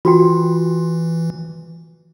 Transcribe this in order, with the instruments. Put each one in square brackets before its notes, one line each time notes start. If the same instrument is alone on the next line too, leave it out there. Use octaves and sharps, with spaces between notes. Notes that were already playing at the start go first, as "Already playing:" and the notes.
[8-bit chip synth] E3 [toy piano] F4 F#4 G5